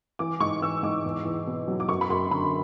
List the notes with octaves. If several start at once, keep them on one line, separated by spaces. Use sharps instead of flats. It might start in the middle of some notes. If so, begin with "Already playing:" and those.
E3 D6
G#2 C#6
E3 E6
G#2 D6
E2
E2
B2
F#3
D6
F#2 C#6
B5
F#2 C6
D3 B5